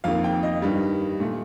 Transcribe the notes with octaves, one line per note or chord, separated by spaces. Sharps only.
F2 D#3 A#3 F5
G5
D#5
G2 D#3 G3
A#2 A3